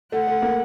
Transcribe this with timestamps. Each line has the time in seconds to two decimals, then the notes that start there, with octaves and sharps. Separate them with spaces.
0.12 A3 F#5
0.27 A3
0.42 A#3